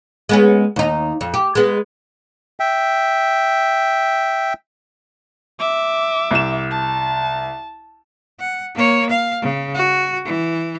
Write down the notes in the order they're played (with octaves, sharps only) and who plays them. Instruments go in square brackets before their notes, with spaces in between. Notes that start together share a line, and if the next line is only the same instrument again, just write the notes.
[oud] G#3 B3 C#4
D#2 D#4
F2
G4
G#3 B3
[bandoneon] E5 G5
[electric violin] E5 D6
[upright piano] C2 E7
[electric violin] A5
[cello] F#5
A#3 C#5
F5
C#3
F#4
E3